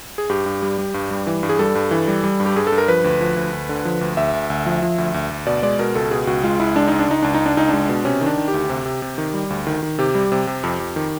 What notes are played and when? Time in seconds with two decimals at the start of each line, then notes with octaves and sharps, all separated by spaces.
0.18 G#4
0.29 G2 G4
0.46 G2
0.62 G3
0.78 G3
0.94 G2
1.11 G3
1.27 E3
1.43 G2
1.49 G#4
1.59 G3 A4
1.75 G2
1.91 E3
2.08 G3
2.24 G3
2.40 G2
2.46 G4
2.56 G2 G#4
2.67 A4
2.72 G2
2.78 A#4
2.88 F3 B4
3.04 D2
3.21 F3
3.36 D2
3.53 D2
3.69 D3
3.85 F3
4.01 D2
4.17 D2 E5
4.33 D2
4.50 D2
4.66 F3
4.82 F3
4.98 D2
5.14 D2
5.30 D2
5.46 B2 D5
5.62 G#3 D5
5.79 B2 A#4
5.95 C#2 A4
6.11 B2 G#4
6.27 C#2 F#4
6.44 G#3 F4
6.59 C#2 E4
6.76 G#3 D4
6.87 C#2 D#4
6.99 D4
7.08 C#2 D#4
7.22 C#2 D4
7.34 D#4
7.40 C#2
7.46 D4
7.57 C#2 D#4
7.69 G#3 D4
7.89 B2
8.05 C3 C#4
8.21 D#3
8.26 D4
8.37 D#3
8.48 G4
8.54 D2
8.70 C3
8.86 C3
9.02 C3
9.18 D#3
9.34 G3
9.50 D2
9.67 D#3
9.83 D#3
9.98 C3 G4
10.15 G3
10.32 C3
10.47 C3
10.63 F2
10.80 F2
10.96 D#3